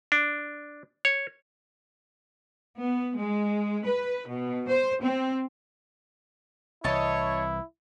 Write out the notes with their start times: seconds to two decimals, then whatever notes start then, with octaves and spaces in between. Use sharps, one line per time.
0.12 D4
1.05 C#5
2.80 B3
3.17 G#3
3.85 B4
4.28 B2
4.70 C5
5.03 C4
6.84 C2 E3 E4 C#5 D#5 A5